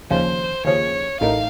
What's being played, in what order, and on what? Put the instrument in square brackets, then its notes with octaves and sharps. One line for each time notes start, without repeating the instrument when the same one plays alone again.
[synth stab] D#2 C#3 F3 [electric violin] C5
[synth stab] D#2 C#3 F3 [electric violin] C#5
[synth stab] A1 A2 A3 D#4 A#4 [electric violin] F5